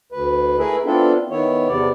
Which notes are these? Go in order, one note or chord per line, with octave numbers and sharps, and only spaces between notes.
D2 B4
A3 E4 G#4 A#4 B4 E5
B3 C4 D4 E4 F4 A4
D#3 B3 E4 C#5
E2 C3 B3 D5